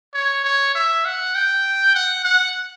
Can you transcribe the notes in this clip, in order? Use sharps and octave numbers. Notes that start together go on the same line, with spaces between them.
C#5
C#5
E5
F#5
G5
F#5
F#5